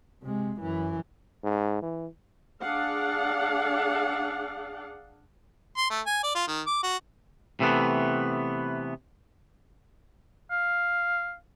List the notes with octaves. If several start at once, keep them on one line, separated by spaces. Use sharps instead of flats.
C3 G#3
F#2 E3
G#2
E3
D4 G#4 D5 F5 F#5
C6
A3
G#5
D5
F4
D#3
D6
F#4
C3 E3 A3 B3
F5